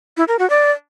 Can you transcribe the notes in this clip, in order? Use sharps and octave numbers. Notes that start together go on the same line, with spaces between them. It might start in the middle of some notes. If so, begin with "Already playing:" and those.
E4
A#4
F#4
D5